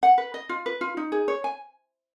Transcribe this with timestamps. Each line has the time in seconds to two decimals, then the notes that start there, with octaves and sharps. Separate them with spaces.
0.03 F#5
0.18 B4
0.34 D#5
0.49 F4
0.66 B4
0.81 F4
0.97 D#4
1.12 G#4
1.28 C#5
1.44 G#5